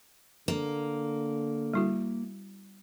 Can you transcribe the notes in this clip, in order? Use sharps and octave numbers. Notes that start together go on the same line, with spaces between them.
D3 A#3
G3 E4 F#4